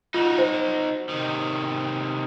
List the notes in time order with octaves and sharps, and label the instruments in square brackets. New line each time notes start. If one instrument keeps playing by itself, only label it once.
[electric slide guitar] D#4 F#4 [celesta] F4
[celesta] C5
[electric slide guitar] C3 D#3